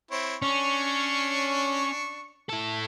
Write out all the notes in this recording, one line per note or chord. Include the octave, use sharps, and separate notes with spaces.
C4 E4 C#5
C#4 D4 C#6
E4 A4